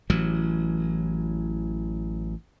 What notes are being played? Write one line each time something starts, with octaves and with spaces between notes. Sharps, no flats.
A1 E3 F#3